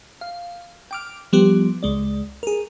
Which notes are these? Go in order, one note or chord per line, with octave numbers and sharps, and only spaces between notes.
F5
G5 D6 F6
F3 G3 B3 G4
C#2 G#3 D5
G#4 A#4